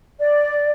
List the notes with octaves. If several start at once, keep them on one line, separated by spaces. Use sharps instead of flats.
D5